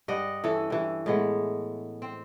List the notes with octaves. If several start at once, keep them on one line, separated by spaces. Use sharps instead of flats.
G2 D5 D#5 F#5
E3 C#4 A4
G2 E3
A2 G#3 B3
C4